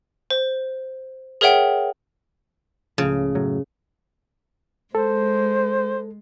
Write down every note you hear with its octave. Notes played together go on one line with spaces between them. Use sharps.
C5
G#4 A#4 C#5 E5 F#5 G5
C#2 A2 C#3 F3
F#1 A2 F#3
G#3 A4 C5